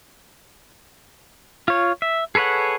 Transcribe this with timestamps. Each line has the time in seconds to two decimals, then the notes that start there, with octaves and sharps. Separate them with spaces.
1.68 F4 C#5
2.02 E5
2.35 G#4 A4 B4 C#5 F#5